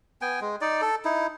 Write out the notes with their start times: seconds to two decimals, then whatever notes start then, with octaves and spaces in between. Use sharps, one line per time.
0.22 B3 G5 G#5
0.41 G#3
0.61 D#4 D5
0.81 A4
1.05 D#4 E4